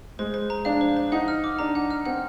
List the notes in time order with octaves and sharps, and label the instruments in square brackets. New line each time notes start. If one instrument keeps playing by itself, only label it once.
[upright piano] G#3 [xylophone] C5
[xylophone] C5
A#5
[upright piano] D4 [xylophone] F5
[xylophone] C5
C5
[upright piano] D#4 [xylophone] F#5
[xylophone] F6
D6
[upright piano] D4 [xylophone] A#5
[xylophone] F#5
F6
[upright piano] C4 [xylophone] F#5